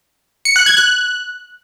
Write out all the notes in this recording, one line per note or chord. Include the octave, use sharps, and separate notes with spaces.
C#7
F#6
G#6
F#6